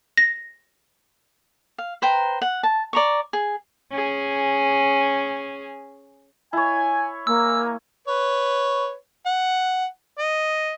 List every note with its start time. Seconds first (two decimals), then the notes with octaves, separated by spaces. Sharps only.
0.17 A#6
1.78 F5
2.02 B4 C5 G5 A#5
2.42 F#5
2.63 A5
2.93 D5 A#5 C#6
3.33 G#4
3.91 C#4 G#4
6.53 E4 C#5 G#5
7.27 G#3 A#3 G#5 A#5 E6
8.08 B4 C#5
9.26 F#5
10.19 D#5